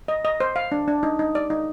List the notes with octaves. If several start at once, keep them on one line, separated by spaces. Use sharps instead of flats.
D#5
D#5
C5
F5
D4
D4
D#4
D#4
D5
D#4